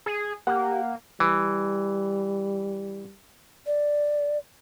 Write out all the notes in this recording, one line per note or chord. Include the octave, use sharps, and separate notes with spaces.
G#4
A#3 G4 F#5
E3 G3
D5